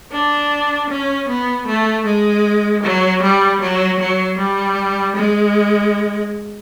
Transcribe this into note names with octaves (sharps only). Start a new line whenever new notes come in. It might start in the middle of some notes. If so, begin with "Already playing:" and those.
D4
C#4
B3
A3
G#3
F#3
G3
F#3
F#3
G3
G#3